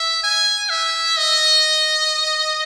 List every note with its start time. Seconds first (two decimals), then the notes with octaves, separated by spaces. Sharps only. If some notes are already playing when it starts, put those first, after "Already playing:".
Already playing: E5
0.23 G#5
0.70 E5
1.17 D#5